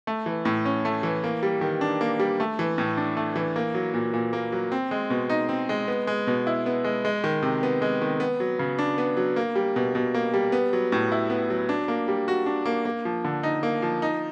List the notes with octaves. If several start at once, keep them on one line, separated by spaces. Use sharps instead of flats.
A3
E3
A2
C#4
A3
E3
A#3
G3
D#3
D4
A#3
G3
A3
E3
A2
D4
A3
E3
A#3
F#3
A#2
A#2
A#3
F#3
C4
G#3
B2
D#4
C4
G#3
B3
G#3
B2
E4
B3
G#3
G#3
D#3
C3
B3
G#3
D#3
B3
F#3
C#3
D4
B3
F#3
A#3
G3
B2
B2
A#3
G3
B3
F#3
A2
E4
B3
F#3
D4
A#3
G3
F#4
D4
A#3
A#3
F3
D3
D#4
A#3
F3
D#4